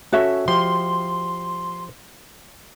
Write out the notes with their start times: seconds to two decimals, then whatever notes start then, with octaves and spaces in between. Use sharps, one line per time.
0.13 C#4 F#4 A4 C#5 E5
0.48 F3 G4 C6